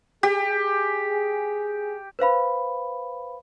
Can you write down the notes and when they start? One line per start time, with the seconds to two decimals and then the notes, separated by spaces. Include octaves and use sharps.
0.23 G4 G#4
2.19 B4 C5 F5 B5